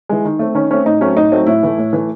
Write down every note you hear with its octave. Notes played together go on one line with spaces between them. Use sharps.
E3 G#3
D#3
A3 C4
D#3 C#4
A3 C4 C#4
A2 D#4
F#3 A3 C4 C#4
A2 D#4
F#3 A3 C4
A2 E4
E3 A3
A2
E3 A3